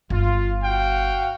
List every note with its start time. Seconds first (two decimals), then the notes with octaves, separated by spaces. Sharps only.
0.10 G1 F4
0.63 F#4 F5 G5